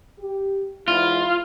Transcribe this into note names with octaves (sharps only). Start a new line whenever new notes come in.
G4
E2 G#2 E4 F4